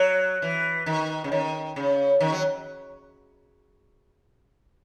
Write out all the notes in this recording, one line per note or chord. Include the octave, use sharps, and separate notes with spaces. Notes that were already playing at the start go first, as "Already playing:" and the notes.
Already playing: F#3
E3
D#3
C#3
D#3
C#3
D#3
F#3